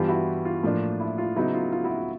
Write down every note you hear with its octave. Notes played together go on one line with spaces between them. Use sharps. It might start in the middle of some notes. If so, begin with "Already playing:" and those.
Already playing: G2 E3 G3 B3 F4 G4
E4 F#4
F4
A2 F3 A#3 D4
E4
F4
C#3 F#3 B3 D#4 E4 F#4
F4
F4
E4 F#4
F4